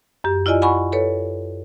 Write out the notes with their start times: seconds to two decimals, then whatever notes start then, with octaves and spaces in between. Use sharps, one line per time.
0.24 F#2 G4
0.46 E4 F4 D5 D#5 G#5
0.62 F#5 G#5 B5 C#6
0.92 A4 B4 C#5